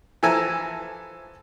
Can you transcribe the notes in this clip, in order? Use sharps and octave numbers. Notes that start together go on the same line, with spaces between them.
E3 F3 A4 E5 G#5 A#5